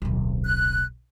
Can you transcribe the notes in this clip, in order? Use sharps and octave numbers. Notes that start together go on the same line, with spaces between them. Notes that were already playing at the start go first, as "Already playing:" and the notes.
D1 B1
F#6